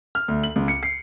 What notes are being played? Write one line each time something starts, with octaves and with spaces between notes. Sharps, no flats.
F6
D2
F#7
C#2
C#7
C7